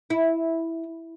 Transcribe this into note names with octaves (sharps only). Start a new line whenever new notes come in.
E4